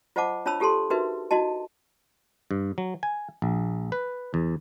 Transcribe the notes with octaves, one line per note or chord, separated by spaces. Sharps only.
F4 C5 D#5 F#5 A5 D6
D4 F4 C#5 A5 B5 E6
F4 G4 A4 A5 C6
D#4 F#4 A#4 B4 E5
D#4 E4 F#4 D#5 A5
G2
F#3
G#5
A#1
B4
E2